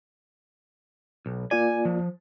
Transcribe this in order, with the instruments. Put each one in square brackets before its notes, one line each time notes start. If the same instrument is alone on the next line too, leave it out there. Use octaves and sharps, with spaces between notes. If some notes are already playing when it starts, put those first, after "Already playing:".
[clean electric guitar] B1
[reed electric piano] A#3 F4 D5 [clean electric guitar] G#5
[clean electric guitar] F3